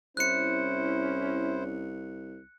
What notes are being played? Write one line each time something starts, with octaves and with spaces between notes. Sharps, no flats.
C2 C#4 E4 C5 F#6 C#7